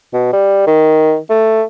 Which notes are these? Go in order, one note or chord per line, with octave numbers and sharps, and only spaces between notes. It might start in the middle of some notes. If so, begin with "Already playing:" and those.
B2
G3
D#3
A3